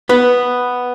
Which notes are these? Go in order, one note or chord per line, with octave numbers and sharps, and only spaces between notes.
B3 B4